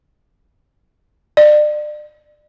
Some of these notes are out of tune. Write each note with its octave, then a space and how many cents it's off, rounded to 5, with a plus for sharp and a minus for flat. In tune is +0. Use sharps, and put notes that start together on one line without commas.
D5 +35